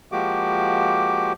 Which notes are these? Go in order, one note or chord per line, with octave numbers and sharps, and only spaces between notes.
F3 G#3 A#3 F#4 G4 D6